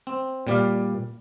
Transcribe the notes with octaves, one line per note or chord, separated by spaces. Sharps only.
C4
A#2 G3 D5 F5